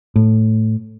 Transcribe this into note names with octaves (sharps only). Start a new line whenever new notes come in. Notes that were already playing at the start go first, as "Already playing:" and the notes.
A2